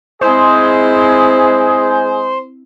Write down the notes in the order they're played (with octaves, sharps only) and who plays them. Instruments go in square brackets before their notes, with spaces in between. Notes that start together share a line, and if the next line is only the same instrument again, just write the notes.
[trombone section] G#3 G#4 [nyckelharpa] C4 E4 [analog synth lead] C5